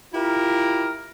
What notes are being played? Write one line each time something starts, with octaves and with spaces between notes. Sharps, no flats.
E4 F4 G4 A#4